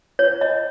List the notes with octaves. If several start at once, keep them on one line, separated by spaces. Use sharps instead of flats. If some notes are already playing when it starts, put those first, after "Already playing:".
C#5
D#5